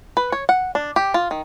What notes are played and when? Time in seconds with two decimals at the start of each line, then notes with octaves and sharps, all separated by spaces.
0.17 B4
0.32 C#5
0.49 F#5
0.75 D4
0.96 G4
1.14 F4
1.31 D#3